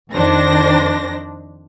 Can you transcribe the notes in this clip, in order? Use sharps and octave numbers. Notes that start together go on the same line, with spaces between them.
F2 D#3 D4 C5 A#6